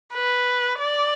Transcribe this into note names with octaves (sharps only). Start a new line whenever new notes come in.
B4
D5